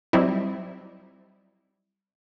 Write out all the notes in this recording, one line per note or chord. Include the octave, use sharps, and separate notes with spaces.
F#3 G3 C4 D#4 E4